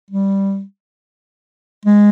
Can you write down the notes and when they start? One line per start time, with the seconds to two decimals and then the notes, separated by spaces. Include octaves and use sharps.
0.11 G3
1.86 G#3